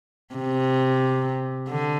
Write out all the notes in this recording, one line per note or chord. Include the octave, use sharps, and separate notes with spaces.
C3
D3